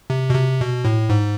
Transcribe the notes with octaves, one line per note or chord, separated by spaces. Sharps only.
C3
B2
C3
B2
A2
G#2